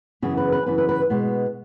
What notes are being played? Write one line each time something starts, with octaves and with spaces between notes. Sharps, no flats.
F#2 C#3 E3 B3 G#4
B4
B4
F#2 C#3 E3 B3 B4
B4
B4
B2 G#3 B3